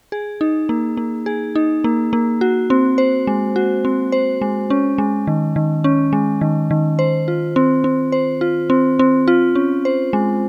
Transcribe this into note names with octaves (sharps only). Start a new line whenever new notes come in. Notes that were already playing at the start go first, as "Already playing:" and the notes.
G#4
D#4
A#3
A#3
G#4
D#4
A#3
A#3
F#4
C4
C5
G#3
F#4
C4
C5
G#3
C#4
G#3
D#3
D#3
C#4
G#3
D#3
D#3
C5
F4
C4
C4
C5
F4
C4
C4
F4
C#4
C5
G#3